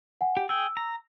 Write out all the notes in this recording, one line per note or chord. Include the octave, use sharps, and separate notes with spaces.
F#5 G#5
G4
G#4 G5 E6
A#5